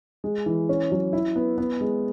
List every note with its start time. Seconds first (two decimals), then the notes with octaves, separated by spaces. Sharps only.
0.24 G#3
0.46 E3
0.69 C#4
0.92 F#3
1.13 E4
1.36 B3
1.58 B3
1.81 G#3